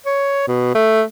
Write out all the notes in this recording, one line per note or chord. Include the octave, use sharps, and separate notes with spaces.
C#5
B2
A3